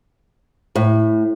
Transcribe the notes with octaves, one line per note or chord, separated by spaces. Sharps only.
A2